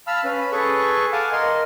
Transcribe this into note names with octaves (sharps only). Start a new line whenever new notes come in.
F5 A5 B5 E6 F6
C#4 B4 B5
G#4 A4 B4 C#6
F5 F#5 G#5 A5 D6
A#4 D#5 C6